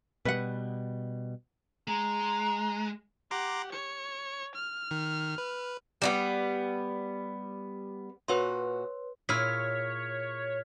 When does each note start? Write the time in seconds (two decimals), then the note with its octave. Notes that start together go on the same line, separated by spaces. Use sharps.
0.25 B2 G3 B4 F#5
1.88 G#3 A#5
3.31 G4 F#5 A#5 C6 D6
3.72 C#5 C#7
4.55 F6
4.91 D#3
5.38 B4
6.02 G3 A#3 B3
8.28 A#2 F#4 B4 C#5 C6
9.29 A#2 E4 G#4 C#5 F6 B6